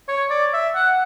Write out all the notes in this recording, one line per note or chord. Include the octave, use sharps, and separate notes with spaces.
C#5
D5
E5
F#5